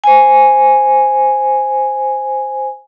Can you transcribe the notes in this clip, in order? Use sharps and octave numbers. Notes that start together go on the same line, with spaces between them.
C5 G#5